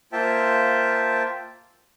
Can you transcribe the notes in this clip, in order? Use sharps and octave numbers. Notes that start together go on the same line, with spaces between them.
A#3 F4 C5 E5 G5 A5